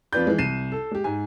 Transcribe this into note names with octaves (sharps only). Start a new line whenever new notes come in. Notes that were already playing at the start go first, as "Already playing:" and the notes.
F2 F4 B4 D5 G6
E3 G#3
C2 C7 D#7 E7
A4
G#3 G4
G#2 G#5